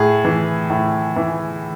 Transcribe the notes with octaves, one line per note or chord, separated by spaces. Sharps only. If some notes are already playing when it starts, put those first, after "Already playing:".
Already playing: A2 G#4
E3
A2
E3